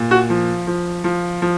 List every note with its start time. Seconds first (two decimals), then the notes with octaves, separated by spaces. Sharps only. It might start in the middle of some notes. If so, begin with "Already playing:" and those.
Already playing: A#2
0.11 F#4
0.30 F3
0.67 F3
1.04 F3
1.42 F3